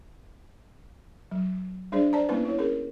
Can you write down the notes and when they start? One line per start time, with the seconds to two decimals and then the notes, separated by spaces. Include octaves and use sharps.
1.31 F#3
1.92 G3 D4 G#4 C5 D5
2.13 C5 D5 A5 A#5
2.29 G3 A#3 B3 C#4 E4 B4
2.45 E4 C#5
2.58 C#4 G#4 A#4